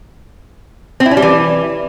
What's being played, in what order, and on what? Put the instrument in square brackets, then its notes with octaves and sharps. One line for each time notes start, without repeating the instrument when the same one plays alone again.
[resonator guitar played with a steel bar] C4
E4
C#4
G3
E3